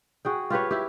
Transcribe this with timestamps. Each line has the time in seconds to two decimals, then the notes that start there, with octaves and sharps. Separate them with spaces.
0.25 F#4 G#4 G5
0.50 F4 G4 B4 C#5
0.71 E4 G4